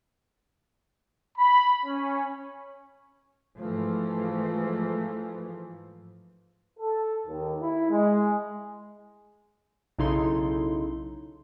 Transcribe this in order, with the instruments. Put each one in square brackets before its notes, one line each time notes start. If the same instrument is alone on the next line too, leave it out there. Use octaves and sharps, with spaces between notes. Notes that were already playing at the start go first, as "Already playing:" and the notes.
[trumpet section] B5
C#4
[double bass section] G#2 E3 F3 A3
[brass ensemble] A4
D#2
E4
G#3
[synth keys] B1 C#3 D#4 E4 A4 C6